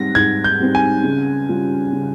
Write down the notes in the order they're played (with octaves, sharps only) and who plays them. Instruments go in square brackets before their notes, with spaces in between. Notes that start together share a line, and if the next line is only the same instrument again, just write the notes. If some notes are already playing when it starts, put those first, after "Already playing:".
Already playing: [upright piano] G#2 G3 C4 [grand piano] A#6
[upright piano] G#2 [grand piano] G#6
[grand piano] G6
[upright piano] G3 C4
[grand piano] G#5
[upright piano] C#3
G3 C#4 F4
C#3